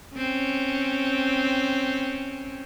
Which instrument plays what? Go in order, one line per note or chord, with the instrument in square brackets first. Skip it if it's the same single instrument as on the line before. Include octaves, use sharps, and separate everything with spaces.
[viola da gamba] C4 C#4